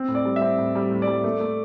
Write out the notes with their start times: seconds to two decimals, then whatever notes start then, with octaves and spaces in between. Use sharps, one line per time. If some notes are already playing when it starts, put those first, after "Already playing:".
Already playing: C4
0.08 A2
0.15 D5
0.25 G3
0.36 E5
0.41 C4
0.58 A2
0.75 G3
0.91 A2
1.02 D5
1.07 G3
1.24 A3
1.40 A3